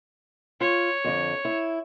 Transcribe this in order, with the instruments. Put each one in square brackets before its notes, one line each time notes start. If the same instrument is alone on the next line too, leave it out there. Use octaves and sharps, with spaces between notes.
[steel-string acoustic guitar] F4 [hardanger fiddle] C#5
[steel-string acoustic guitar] F2 D3
E4